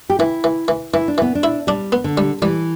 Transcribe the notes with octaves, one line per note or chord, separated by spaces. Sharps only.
G4
E3 E4
E3
E3
E3 E4
D4
E3 B3
D4
E4
G3 D4
B3
D3
G3
E3 G3